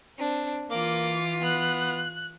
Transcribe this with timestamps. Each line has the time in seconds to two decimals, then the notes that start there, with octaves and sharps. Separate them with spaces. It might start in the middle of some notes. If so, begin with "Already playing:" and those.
0.18 C4 D4
0.70 E3 A#3 F4 D6
1.42 B3 F#6